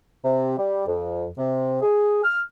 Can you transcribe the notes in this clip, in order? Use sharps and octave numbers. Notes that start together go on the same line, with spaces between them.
C3
G3
F2
C3
G#4
F6